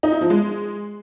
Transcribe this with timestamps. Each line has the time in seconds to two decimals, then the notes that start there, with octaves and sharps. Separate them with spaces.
0.03 D#4
0.12 E4
0.21 F3
0.30 G#3